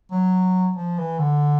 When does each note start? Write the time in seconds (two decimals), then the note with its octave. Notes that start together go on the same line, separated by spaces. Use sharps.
0.11 F#3
0.76 F3
0.98 E3
1.19 D3